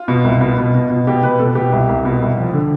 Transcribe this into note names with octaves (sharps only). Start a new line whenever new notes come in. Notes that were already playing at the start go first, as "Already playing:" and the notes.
Already playing: F4
B2
C2
B2
B2
B2
B2
B2 G4
B2 B4
B2 A4
B2 G4
C2
C2
B2
C2
F3
D3